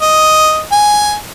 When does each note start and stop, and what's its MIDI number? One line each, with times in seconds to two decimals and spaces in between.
0.01 0.63 75
0.72 1.16 80